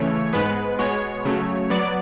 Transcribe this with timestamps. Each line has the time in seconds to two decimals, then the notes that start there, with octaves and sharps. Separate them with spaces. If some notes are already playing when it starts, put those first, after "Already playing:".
Already playing: C#3 E3 A3 C#5
0.33 G#2 G#3 B3 B4
0.79 B2 G#3 B3 C#5
1.25 C#3 F#3 A3
1.70 F#3 B3 D5